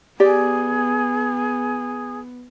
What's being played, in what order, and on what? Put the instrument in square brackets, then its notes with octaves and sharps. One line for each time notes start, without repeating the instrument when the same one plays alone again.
[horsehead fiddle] B3 [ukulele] G4 D5 [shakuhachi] G#4